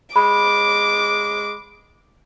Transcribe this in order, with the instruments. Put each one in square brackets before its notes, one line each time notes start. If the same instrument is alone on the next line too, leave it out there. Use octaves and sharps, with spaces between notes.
[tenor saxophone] G#3 [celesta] B5 [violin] D6